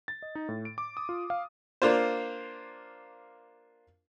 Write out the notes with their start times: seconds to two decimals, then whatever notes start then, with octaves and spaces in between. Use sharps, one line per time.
0.08 A6
0.22 D#5
0.35 D#4
0.49 A2
0.65 D7
0.78 D6
0.97 D#6
1.09 F4
1.30 F5
1.82 A#3 D4 F4 C5